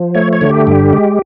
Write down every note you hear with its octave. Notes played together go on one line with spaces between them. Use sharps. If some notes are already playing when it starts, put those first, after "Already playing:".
Already playing: F3
A3 C#5
C#5
D3
G4
G2
G#3